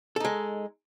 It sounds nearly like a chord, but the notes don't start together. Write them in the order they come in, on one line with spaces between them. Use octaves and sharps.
A4 D#4 G#3